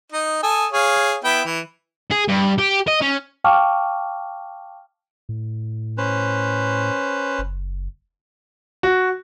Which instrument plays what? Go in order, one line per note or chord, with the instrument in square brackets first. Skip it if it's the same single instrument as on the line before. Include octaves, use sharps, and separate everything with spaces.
[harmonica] D#4 D#5
A4 G#5 D#6
G#4 C#5 F5
B3 E4 G5
E3
[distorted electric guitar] G#4
G2
G4
D#5
C#4
[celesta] F5 G5 A5 C#6 D6 F6
[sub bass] A2
[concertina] C#4 B4 C5
[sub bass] F#1
[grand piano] F#4